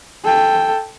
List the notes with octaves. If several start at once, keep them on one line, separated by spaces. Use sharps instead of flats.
A4 G5